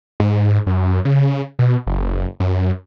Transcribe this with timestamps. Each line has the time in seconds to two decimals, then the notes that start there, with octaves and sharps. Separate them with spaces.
0.20 G#2
0.67 F#2
1.05 C#3
1.59 B2
1.87 F#1
2.40 F#2